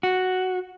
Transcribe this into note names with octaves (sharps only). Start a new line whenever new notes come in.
F#4